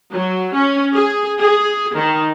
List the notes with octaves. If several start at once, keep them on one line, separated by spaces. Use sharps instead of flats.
F#3
C#4
G#4
G#4
D#3